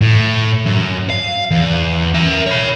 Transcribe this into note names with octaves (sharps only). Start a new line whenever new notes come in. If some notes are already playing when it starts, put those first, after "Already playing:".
A2
F#2
F5
E2
A#4 E5
C#5 B5